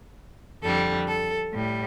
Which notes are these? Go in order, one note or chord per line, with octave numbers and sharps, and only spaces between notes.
F2 D3 G3 A4
A4
A2 G3